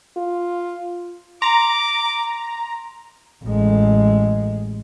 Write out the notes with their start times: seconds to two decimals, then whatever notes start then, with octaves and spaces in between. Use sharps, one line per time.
0.17 F4
1.42 A#5 C6 D6
3.45 A1 G#3